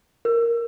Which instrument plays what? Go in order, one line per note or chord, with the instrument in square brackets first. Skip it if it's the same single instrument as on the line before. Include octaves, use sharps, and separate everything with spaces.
[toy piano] A#4